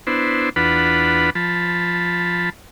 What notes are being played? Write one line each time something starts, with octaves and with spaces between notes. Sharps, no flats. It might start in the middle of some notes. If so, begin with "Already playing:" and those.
B3 D4 E4 C5
E2 D4 F4 B4 F#5 B5
F3 A5 B5